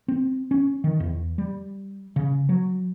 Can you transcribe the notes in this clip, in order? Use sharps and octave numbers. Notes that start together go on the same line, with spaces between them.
C4
C#4
D#3
E2
G3
C#3
F#3